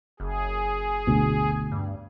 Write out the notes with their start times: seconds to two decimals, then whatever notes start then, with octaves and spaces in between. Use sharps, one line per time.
0.20 F#1 G#4
1.07 D2 B2
1.72 G2